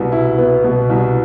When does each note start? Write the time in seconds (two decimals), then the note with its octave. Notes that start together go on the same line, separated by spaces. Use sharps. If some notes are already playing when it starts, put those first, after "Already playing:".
Already playing: C2 B2 B3
0.12 E4
0.38 B3
0.64 B2
0.89 C2